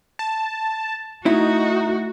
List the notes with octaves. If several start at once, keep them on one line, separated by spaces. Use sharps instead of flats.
A5
A3 D#4 E4 F#4